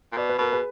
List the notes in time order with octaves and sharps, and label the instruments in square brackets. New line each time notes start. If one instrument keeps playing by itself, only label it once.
[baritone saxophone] A#2
[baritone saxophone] B2 [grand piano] D5
[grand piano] B4
[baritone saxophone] B2 [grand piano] A#4
[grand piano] G#4 B4